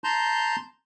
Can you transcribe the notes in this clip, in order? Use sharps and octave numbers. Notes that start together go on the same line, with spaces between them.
A5 A#5 C6 G6